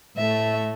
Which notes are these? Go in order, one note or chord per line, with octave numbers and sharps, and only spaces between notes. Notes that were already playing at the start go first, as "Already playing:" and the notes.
A2 A3 E5